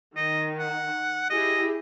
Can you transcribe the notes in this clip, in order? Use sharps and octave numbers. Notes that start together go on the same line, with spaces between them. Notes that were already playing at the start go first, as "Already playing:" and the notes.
D#3 D#5
F#5
E4 G4 G#4 D#5